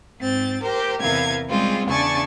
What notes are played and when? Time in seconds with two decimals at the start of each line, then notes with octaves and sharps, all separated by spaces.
0.19 G#2 C4 A6
0.63 G4 A#4 C5
1.00 E2 C3 E3 A#4 F5 G#6
1.49 G3 G#3 C4 C#4 F4 G#4
1.87 E2 C#3 D4 G#5 C#6 A6